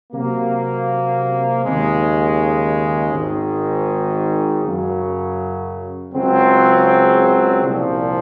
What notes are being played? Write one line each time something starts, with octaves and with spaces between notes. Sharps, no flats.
C3 F#3 A#3
D#2 C#3 G#3
G#1 G#2 D#3
F#2 C#3 F#3
C#2 C#3 F#3 C4
C2 A#2 F3